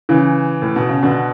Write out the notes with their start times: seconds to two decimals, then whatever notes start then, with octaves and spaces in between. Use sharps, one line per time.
0.09 C#3 E3
0.62 A2
0.76 B2
0.89 C#3
1.03 B2 D3